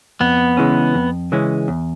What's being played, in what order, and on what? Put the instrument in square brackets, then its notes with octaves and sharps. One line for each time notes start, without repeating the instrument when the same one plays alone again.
[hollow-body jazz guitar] F2 [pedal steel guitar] B3
[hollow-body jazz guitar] C#3 E3 G#3 C#4
F2
C#3 E3 G#3 C#4
E2